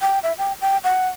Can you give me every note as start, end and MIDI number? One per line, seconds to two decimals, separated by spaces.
0.01 0.19 79
0.23 0.33 76
0.38 0.53 79
0.61 0.78 79
0.84 1.08 78